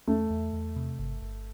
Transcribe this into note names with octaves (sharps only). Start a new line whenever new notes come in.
E2 A3
E2
E2
C3
G1
G1